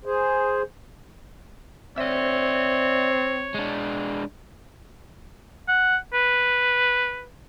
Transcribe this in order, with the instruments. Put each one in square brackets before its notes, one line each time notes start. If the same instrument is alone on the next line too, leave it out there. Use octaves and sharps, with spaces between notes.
[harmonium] G#4 C5
[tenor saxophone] C4 [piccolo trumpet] C#5 [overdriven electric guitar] D5 E5
[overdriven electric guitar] G#3 D4
[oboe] F#5
B4